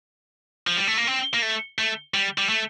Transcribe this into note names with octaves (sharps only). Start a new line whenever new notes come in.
F3
G3
A3
A#3
C4
A#3
A3
A3
G3
G3
A3